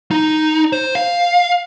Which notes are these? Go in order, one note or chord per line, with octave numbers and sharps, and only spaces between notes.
D#4
C5
F5